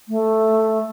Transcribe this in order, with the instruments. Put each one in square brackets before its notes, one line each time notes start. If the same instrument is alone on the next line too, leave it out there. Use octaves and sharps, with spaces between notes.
[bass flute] A3